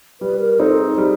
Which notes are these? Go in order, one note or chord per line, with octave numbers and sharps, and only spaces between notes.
G3 B4
A#4
C4 D#4 A4
G#4
G3